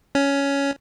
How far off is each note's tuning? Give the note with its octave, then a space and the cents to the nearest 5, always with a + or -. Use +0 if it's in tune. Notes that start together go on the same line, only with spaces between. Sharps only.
C#4 +10